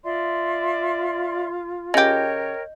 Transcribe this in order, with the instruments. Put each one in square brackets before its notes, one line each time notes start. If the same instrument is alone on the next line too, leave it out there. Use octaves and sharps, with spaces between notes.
[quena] F4 [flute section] D5 E5 C6
[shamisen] C#3 G4 [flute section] A#4 C#5 G5 [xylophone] D#5 G6